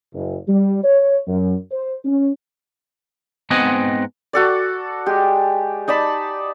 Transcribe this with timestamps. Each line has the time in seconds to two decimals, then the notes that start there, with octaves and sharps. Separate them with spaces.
0.14 F#1
0.47 G3
0.83 C#5
1.27 F#2
1.72 C5
2.05 C#4
3.50 G#2 B3 C4 D#5 F#5 G#5
4.33 F#4 A4 D5
5.06 G#3 G4
5.88 D#4 D5 A5 B5